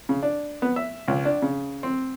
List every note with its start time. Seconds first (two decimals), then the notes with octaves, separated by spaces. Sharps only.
0.09 C#3
0.23 D4
0.62 B3
0.76 E5
1.08 C#2
1.25 D4
1.42 C#3
1.83 C4